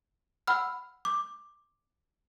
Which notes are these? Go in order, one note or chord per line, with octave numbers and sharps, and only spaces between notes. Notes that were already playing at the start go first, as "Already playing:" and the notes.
F#5 B5 E6 F6
D6